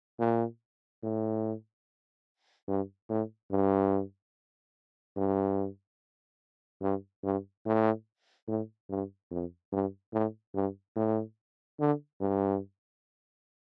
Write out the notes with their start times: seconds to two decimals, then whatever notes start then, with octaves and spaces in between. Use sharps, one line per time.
0.19 A#2
1.03 A2
2.68 G2
3.09 A2
3.51 G2
5.17 G2
6.82 G2
7.23 G2
7.65 A2
8.48 A2
8.89 G2
9.31 F2
9.72 G2
10.13 A2
10.54 G2
10.96 A2
11.80 D3
12.21 G2